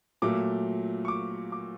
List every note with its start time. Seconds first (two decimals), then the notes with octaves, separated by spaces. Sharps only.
0.22 A#2 F#3 A3 D6
1.05 C#6
1.08 D6
1.52 D6